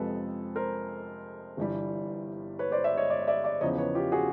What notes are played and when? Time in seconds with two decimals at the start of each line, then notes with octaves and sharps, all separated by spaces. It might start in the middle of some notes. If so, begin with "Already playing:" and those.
Already playing: F2 C3 F3 G#3 A4 B4
0.55 A#4 C5
1.57 G1 G2 E3 G3
2.59 B4 C#5
2.72 C5 D5
2.84 D5 E5
2.97 C#5 D#5
3.10 C5 D5
3.21 D#5
3.27 D5 E5
3.44 D5 E5
3.61 E2 C#3 F3 C#5 D#5
3.78 B4 C#5
3.95 F4 G4
4.12 F#4 G#4